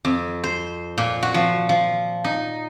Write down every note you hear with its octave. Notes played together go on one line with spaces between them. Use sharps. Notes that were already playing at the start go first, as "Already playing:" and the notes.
F2
C5
A#2
F#4
F3
F3
D#4